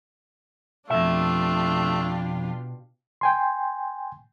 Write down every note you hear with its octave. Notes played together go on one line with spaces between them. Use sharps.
F2 B2 A3 D4 F4 G4 E5
G5 G#5 C6